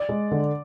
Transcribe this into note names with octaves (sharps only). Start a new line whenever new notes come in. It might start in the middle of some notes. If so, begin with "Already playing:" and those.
Already playing: D5
G#3
D3